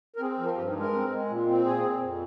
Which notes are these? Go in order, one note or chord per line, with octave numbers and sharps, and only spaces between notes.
A#4
C4 G#4
F3
A#4
G2 G4
D#4
G#3
A#4
C4
G#3
A#2
C4
A#2 G#4
C4
F2